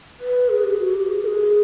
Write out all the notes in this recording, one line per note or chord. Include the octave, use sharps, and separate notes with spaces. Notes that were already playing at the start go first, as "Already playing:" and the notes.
B4
G#4
G4
F#4
G4
G#4
A#4
G#4